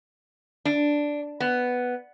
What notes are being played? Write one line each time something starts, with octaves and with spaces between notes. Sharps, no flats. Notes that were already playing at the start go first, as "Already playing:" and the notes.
D4
B3